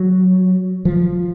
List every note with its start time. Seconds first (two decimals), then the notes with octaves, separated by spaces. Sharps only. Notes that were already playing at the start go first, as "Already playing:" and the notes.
Already playing: F#3
0.85 F3